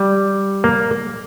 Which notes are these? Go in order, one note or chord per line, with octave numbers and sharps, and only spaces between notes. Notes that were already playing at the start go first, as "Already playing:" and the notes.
Already playing: G3
A#3